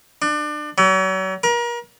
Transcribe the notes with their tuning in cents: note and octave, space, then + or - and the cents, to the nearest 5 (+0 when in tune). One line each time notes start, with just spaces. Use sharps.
D4 +30
F#3 +40
A#4 +35